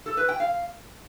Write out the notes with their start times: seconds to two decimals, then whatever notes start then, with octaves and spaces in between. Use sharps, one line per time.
0.06 A4
0.17 B4
0.29 G5
0.40 F5